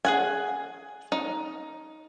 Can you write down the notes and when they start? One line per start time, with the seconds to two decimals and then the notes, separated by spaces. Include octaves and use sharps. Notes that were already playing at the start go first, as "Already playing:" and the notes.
0.05 G#4 F#5 G#5
1.12 D#4